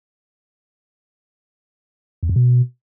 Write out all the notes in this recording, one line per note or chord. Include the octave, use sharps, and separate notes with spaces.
E2
F2
B2